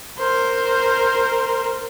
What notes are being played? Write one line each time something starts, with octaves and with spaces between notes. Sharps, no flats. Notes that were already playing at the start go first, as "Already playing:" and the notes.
A#4 C5